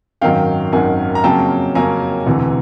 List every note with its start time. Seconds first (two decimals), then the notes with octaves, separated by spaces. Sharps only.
0.21 G#1 F#2 D#3 F#3 F5 G5
0.72 G#1 F#2 D#3 F#3 F#5 G#5
1.15 A#5
1.24 F2 C#3 F#3 A#3 C#4 G5 A5
1.75 F2 C#3 F#3 A#3 C#4 G#5 A#5
2.26 E1 D2 C3 E3